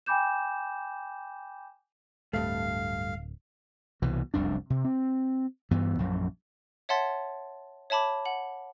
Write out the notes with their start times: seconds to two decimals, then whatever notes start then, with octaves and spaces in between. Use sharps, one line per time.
0.06 G5 G#5 B5 D6 G6 E7
2.33 D1 G2 A3 F5
4.02 C2 B2 E3
4.34 F1 C2 F#2 D4
4.70 C3
4.85 C4
5.71 G2 E3 B3
5.98 A#1 F#2
6.89 C#5 E5 F#5 A5 C6 A6
7.90 C#5 E5 A5 B5 D6
8.25 F#5 F#7